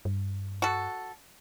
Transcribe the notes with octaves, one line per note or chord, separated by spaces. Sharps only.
G2
F#4 A4